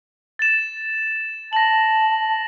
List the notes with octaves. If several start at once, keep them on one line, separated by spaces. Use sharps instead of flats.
A6 E7
A5 A#6 F#7